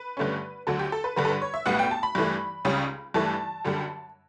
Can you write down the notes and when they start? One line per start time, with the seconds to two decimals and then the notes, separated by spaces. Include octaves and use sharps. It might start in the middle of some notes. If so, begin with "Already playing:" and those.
Already playing: B4
0.17 G2 D3 A3 C#4
0.67 D2 D3 F#3 A4
0.79 G4
0.92 A4
1.04 B4
1.16 G2 D3 G3 B4
1.25 A4
1.29 B4
1.42 C#5
1.54 E5
1.66 B1 A2 G3 B3 F#5
1.79 G5
1.91 A5
2.03 B5
2.15 G2 E3 A3
2.65 C#2 C#3 G3 C#4
3.14 G2 E3 A3 A5
3.65 F#2 D3 G3